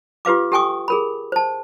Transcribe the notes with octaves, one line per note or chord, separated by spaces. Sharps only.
F4 G4 B4 F5 D6
G4 A4 G5 G#5 C#6 D#6
G#4 A#4 B5
C5 A5